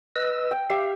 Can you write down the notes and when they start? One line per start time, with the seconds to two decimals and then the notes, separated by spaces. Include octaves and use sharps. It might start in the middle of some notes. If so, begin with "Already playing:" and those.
0.16 B4 D#5 E6
0.51 G5
0.70 G4 E5 F5